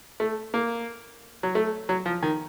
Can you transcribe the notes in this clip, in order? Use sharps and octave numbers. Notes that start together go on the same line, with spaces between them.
A3
A#3
F#3
A3
F#3
F3
D#3